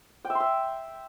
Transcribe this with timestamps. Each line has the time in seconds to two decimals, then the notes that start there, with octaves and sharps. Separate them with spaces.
0.25 G5
0.30 E5
0.35 C6
0.40 E5